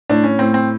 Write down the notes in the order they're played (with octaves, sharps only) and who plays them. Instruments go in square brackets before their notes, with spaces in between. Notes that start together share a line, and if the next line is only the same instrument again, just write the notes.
[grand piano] A2 D4
C#4
A2 C4
C4